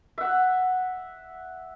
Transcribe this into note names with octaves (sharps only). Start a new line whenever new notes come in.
E5 F#5